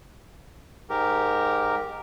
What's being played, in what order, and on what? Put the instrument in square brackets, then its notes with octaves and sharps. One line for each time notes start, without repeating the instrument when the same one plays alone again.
[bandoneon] G#2 G4 A#4